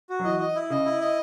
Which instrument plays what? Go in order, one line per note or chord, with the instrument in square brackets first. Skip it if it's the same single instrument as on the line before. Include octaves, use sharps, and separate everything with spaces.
[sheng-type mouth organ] F#4
[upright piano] F#3
[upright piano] E3 [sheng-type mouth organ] D#5
[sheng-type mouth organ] D#5
E4
[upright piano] C#3 [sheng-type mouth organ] D#5
[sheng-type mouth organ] E4
D#5